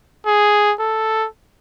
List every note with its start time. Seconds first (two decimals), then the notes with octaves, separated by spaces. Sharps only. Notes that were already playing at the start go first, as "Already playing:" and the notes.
0.26 G#4
0.80 A4